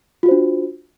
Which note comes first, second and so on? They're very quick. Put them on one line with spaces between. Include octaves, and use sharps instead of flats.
F4 F#4 C5 D4